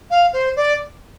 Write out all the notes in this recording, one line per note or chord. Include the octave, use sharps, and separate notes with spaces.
F5
C5
D5